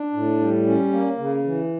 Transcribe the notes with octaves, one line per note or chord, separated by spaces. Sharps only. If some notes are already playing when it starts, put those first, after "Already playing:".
Already playing: D4
A2
G3
C#4
A#3
C#3
E3